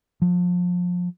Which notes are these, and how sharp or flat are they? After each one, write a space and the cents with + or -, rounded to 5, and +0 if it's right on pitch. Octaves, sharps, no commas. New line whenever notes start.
F3 +30